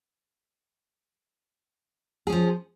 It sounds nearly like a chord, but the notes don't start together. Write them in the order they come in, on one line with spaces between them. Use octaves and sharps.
G#4 C#4 F3